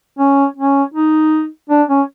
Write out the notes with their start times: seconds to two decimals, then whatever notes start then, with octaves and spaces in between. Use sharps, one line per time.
0.19 C#4
0.57 C#4
0.94 D#4
1.70 D4
1.89 C#4